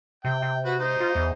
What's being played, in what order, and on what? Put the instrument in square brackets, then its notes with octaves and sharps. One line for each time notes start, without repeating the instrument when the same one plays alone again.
[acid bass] C3 [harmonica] G5
[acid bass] C3
[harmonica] F#4 B4
D#4 C5
[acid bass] F4
E2